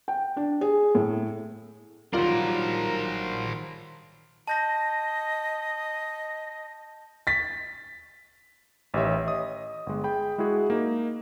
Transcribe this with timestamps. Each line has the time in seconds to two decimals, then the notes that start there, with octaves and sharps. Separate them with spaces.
0.08 G5
0.37 D4
0.61 G#4
0.95 A2
2.14 D#3 F#3 G3 F4 A#4 C5
4.48 D#5 A5 G6 A#6
7.27 A6 B6
8.94 A1 D#3 G4 C#5 E5
9.26 D#5 D#6
9.87 G1 G#3
10.04 G#4 G5 B5
10.38 G#3 E4 F#4 G#4
10.70 A#3 D#4